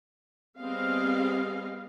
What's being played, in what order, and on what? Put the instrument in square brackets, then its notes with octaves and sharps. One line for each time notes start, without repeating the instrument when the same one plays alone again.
[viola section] G3 B3 C4 G#4 D#5 F5